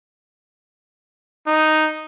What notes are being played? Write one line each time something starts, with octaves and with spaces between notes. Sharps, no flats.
D#4